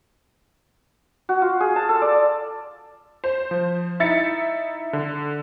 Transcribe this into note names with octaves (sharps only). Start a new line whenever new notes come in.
F#4
F4
G#4
A5
A4
D5
C5
F3
D#4 E4 E5 A6 C#7
D3